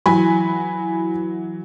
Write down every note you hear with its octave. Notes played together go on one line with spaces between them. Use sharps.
E3 F#3 G#5 B5